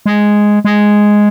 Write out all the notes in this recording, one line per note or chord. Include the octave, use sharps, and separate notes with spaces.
G#3
G#3